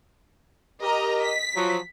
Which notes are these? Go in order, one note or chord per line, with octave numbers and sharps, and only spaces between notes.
G4 A#4 D#5 A#5
B6
F3 F#3